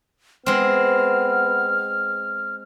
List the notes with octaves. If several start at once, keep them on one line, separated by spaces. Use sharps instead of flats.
G#3 B3 C4 F6